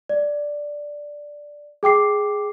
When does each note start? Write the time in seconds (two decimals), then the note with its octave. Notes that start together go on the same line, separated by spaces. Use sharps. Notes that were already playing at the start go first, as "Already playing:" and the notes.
0.09 D5
1.83 G#4 G5 D6 C7